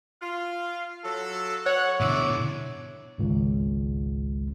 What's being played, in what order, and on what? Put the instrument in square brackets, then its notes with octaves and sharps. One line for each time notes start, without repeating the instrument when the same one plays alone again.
[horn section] F4 F5
F#3 A4
[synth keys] C#5 [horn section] F#5
[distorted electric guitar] B2 D3 [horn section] E4 D5
[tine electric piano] G#1 C#2